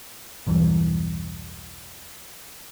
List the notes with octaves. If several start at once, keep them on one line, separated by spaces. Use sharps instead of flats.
B1 E2 G2 E3